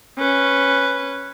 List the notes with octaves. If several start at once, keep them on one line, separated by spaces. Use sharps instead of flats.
C#4 B4